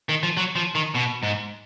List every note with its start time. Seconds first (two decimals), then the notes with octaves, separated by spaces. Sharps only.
0.09 D#3
0.23 F3
0.37 F#3
0.56 F3
0.75 D#3
0.95 B2
1.23 G#2